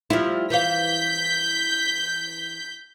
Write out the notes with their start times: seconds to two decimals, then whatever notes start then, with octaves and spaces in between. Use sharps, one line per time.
0.10 F3 G3 E4
0.50 E3 F5 G6 B6